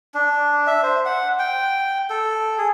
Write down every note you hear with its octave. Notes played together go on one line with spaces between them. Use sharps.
D4
E5
C5
F#5
G5
A4
G#4